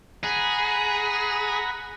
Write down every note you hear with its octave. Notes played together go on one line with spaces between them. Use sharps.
G#4 F#5 A#5 B5